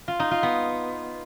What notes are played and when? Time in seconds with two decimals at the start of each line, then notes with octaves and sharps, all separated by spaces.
0.08 F4
0.20 D#4
0.31 F4
0.43 B3